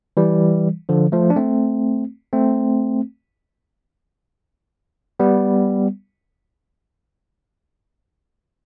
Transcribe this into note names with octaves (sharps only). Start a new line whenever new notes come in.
E3 G3
D3 F3
F3 A3
D4
A3 C4
A3 C4
G3 B3